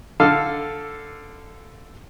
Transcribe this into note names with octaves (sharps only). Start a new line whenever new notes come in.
D3 A4 F5